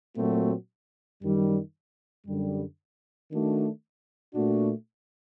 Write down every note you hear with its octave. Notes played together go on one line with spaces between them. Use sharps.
A#2 F#3 A3 C4 F#4
F#2 D#3 G3
F#2 D3 G3
D#3 A3 D4 F#4
A#2 A3 D4 F#4